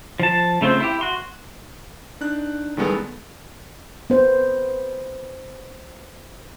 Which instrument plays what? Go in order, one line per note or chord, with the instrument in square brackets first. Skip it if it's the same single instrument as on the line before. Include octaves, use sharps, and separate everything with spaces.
[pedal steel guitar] F3 A5
C#3 A3 C4 F4 C5
E4 G4
F#4 C6
[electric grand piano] D4 D#4 F#6
A1 D#3 G3 G#3 B3 A4
[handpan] B3 C5